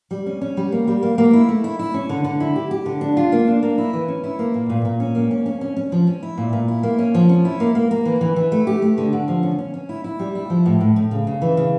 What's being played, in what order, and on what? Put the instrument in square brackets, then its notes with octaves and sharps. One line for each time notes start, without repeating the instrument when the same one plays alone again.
[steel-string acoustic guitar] G3
C#4
C#4
G3
A#3
G3
A#3
A#3
E4
A3
E4
E4
C#4
D3
D3
E4
G4
G4
D3
D4
F4
A#3
D4
A#3
E4
E3
C#4
E4
A#3
A#2
A#2
A#2
C#4
A#3
C#4
C#4
C#4
C#4
F3
C#4
E4
A#2
A#2
E4
A#3
C#4
F3
C#4
E4
A#3
A#3
A#3
E3
E3
E3
A3
G4
A3
D3
D3
F3
C#4
C#4
C#4
E4
E4
G3
E4
F3
A2
A2
A2
C#3
C#3
E3
C#3